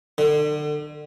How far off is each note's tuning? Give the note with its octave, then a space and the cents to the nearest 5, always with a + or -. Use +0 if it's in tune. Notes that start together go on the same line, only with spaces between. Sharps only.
D3 +35